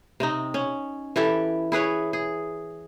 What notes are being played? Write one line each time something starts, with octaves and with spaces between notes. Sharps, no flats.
C3 C4 D#4
C#4
E3 E4 G4 A4
E4 G#4 B4 C#5
G#4